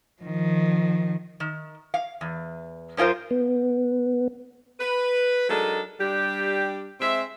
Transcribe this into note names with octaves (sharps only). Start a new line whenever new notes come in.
D#3 F3
D#3
F5
E2
F#2 C#4 F4 A#4 C5
B3
B4
F#3 G#3 D4 D#4 A4 A#4
G3 D4 G4
G#3 C4 C5 E5